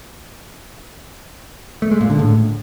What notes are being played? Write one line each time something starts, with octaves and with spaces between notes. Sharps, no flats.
A3
G#3
A#2
D3
A2